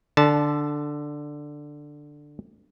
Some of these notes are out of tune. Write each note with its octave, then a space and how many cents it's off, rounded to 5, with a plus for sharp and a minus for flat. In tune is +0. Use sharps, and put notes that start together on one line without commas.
D3 +5 A5 -15